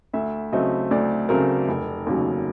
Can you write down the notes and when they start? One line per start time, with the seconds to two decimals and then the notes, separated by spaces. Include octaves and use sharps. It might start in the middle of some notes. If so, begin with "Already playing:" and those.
0.13 D2 E5
0.52 C#3 F#3 A3 C4 D#5
0.91 D2 D5
1.29 C#3 F#3 A3 C4 A#4
1.68 F1
2.06 D#2 C#3 F#3